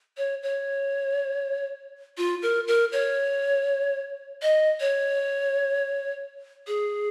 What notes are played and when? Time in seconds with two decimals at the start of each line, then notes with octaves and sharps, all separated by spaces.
0.17 C#5
0.43 C#5
2.18 F4
2.42 A#4
2.68 A#4
2.92 C#5
4.42 D#5
4.80 C#5
6.67 G#4